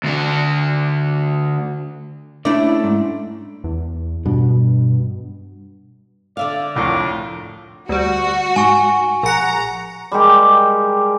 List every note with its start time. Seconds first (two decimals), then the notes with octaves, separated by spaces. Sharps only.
0.04 D2 D3
2.45 A3 C#4 D4 E4 D5
2.84 G#2
3.64 E2
4.26 G2 B2
6.37 D3 D5 E5 F5
6.76 C2 F2 A2 A#4 D6
7.89 D2 G3 F#4
8.56 G#2 G#5 C#6
9.23 A#1 F#5 A#5
10.12 G3 G#3 G4 A#4